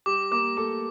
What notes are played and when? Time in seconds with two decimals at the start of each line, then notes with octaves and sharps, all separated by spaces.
0.06 G3 G4 D6
0.31 A#3 A#4 D6
0.57 A3 A4 D6